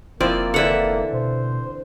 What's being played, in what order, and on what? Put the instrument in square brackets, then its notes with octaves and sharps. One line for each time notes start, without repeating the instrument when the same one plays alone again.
[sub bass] F1 [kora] F3 C4 E4 [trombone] A#3 [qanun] D5
[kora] D3 E3 A4 [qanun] E5 F#5
[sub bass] B2 [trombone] C5